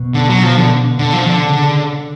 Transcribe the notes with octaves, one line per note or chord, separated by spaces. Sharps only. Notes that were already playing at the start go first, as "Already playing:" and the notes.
Already playing: B2
D3
F#3
F3
D3
D3
F3
D3
C#3
D3